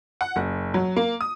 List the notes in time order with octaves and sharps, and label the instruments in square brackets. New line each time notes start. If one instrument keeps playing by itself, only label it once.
[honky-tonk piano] F#5
F#1
F#3
A#3
D#6